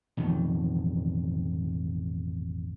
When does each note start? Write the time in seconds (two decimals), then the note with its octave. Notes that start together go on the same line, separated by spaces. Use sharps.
0.17 A1 F2 B2 D#3